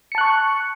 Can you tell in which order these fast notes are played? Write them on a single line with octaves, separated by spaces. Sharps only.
C#7 A5 F#6 C#6